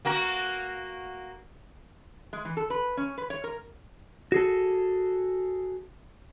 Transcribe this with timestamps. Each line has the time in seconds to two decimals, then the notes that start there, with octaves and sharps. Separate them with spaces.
0.05 A#3 F#4 A#4
2.33 G#3
2.45 E3
2.57 A4
2.70 B4
2.97 C#4
3.18 B4
3.30 C#5
3.44 A#4
4.32 F#4 G#4 A4